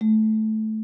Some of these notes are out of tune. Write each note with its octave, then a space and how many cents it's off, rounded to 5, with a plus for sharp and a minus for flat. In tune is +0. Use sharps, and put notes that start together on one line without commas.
A3 -15